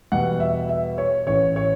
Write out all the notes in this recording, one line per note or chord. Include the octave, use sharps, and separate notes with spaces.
E2 B2 G3 F#5
E5
E5
C#5
A1 A2 E3 C#5
C#5